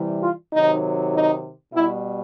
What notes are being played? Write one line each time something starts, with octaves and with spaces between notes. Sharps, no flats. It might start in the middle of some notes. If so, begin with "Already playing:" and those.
Already playing: C3 E3 G3
F4
C3 D#3 F#3 D#4
D#4
B2 G3 E4